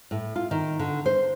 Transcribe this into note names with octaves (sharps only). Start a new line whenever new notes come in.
A2
F4
D#3
D3
C5